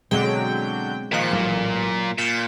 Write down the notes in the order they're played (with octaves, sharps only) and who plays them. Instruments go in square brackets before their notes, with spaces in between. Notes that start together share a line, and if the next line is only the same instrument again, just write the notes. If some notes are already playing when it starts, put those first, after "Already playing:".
[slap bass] B2 C4 [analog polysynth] D3 F#3 G5 [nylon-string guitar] G#3
[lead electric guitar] A#2 A#3 [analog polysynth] D#3 F3 F#6
[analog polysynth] A1 [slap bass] F#3
[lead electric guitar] A#2 [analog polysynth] G6 A6 B6